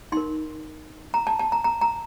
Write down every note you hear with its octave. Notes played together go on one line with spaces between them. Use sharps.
D#4 A#4 C6
A#5
A5
A5
A#5
A#5
A#5